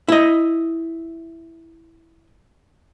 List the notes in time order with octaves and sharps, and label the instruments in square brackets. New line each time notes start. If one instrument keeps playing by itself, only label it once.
[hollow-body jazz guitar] E4 D#5